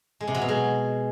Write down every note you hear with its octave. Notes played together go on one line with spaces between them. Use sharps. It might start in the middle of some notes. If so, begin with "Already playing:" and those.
G#3
C3
F#3
B2
G#3